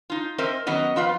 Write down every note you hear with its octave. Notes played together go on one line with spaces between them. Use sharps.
D#4 F4
C4 A#4 C5 D#5 E5
D#3 F#3 B3 C#4 D#5
F2 F4 B4 F5